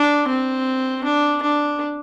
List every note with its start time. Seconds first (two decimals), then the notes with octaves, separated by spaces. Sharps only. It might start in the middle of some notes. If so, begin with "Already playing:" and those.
Already playing: D4
0.28 C4
1.04 D4
1.42 D4